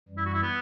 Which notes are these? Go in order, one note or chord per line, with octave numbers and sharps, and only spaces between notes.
F#2 E3 G3
E4
F#4
E4
B3